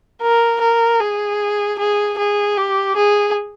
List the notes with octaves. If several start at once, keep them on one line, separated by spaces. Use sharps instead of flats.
A#4
A#4
G#4
G#4
G#4
G4
G#4